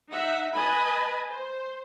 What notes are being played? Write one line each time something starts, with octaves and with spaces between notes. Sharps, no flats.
D#4 E5 F#5
B4 D#5 G#5 A5 B5
C5